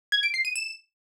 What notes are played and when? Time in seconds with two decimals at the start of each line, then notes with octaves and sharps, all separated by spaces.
0.12 G#6
0.23 D7
0.34 C7
0.45 D#7
0.56 E7